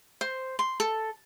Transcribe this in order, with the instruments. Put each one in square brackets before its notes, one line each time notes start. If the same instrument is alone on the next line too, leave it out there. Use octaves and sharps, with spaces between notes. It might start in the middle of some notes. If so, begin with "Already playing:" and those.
[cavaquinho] C5
C6
A4